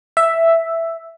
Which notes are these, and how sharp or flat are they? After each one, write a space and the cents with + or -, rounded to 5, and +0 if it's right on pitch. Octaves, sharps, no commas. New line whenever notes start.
E5 +5